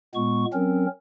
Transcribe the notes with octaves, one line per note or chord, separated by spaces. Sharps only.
A#2 G#3 B3 C#6
F#3 C4 C#4 A#4